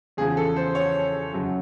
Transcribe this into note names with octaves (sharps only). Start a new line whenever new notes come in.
E2 C#3 F3 G#4
A4
C5
C#5
F#2 C#3 F#3